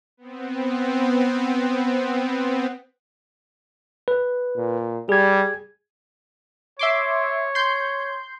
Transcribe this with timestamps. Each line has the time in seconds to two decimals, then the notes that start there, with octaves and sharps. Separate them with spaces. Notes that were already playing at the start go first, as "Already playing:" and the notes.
0.17 B3 C4
4.08 B4
4.56 A#2
5.09 G3 G#4 G#6
6.79 C#5 E5 C6 D6
7.55 C6 G6